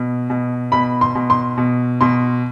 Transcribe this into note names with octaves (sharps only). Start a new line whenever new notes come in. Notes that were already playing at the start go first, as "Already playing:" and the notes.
Already playing: B2
B2
B2 B5
C6
B2
C6
B2
B2 C6